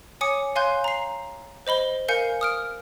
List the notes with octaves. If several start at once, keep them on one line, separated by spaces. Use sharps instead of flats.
C#5 G#5 D6 D#6 C#7
C#5 F5 G#5 C6 F#6 G6
A#5 C7
C5 D#5 B5 G7
A#4 F5 G#5 G6 C#7
D#6 F6 D7